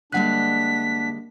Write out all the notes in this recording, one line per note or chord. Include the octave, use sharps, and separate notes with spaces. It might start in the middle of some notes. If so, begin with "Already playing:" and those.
D3 G3 G#3 A#3 D4 F#5 F#6 B6